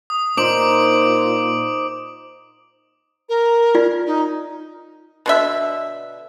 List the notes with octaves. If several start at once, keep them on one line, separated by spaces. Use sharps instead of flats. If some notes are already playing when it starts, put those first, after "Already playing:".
D#6
A#2 D#4 C5 D6 D7 F#7
A#4
F4 D5
D#4
B2 D3 E5